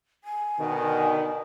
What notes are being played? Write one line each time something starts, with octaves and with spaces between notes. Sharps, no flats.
G#5
B2 D3 D#3